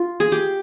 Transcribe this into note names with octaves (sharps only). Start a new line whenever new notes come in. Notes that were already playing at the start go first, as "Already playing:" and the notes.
Already playing: F4
G#4
G4